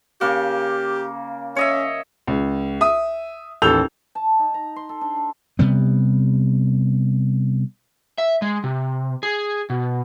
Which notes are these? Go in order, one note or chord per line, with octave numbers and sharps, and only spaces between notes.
C#3 A#3 G4
C#4 C#5 D#5 E5
C#2
E5 D#6
A1 D#2 A4 E6 G6 F7
A5
D#4
A#5
C6
A4
D4
D4
C3 G3 B3
E5
G#3
C3
G#4
B2